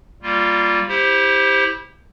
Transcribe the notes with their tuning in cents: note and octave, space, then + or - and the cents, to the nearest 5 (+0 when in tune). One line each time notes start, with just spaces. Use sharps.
G3 +0 A#3 -5 F4 +0
E4 -25 G4 +15 C5 +0